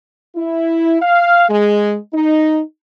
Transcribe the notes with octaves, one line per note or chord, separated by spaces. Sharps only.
E4
F5
G#3
D#4